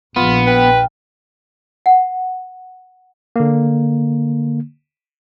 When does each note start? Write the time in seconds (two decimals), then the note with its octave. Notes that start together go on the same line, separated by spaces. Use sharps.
0.16 A#1 B3 F4
0.47 B4 G5
1.86 F#5
3.36 D3 A#3